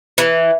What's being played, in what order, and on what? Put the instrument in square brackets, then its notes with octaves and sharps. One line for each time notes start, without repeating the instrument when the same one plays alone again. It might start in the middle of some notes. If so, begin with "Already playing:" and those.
[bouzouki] E3